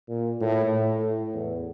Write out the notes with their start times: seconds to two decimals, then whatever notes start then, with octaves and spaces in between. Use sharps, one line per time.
0.09 A#2
0.41 A2
0.72 A2
1.03 A2
1.33 E2